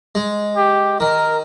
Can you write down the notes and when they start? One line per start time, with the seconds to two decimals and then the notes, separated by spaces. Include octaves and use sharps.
0.15 G#3
0.57 G4
1.00 D#3 A#4